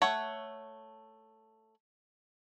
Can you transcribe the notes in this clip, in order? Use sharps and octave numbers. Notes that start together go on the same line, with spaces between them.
A3 C#5 F#5